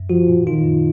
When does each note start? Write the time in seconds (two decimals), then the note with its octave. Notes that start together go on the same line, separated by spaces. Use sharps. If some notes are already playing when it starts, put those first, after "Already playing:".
Already playing: F#2
0.09 F3 F#4
0.28 A#2
0.47 D#3 F4
0.64 F#2